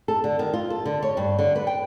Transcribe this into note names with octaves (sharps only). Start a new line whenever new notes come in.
A4
D3
D#3
F4
A4
D3
C#5
G2
D3
B4
G5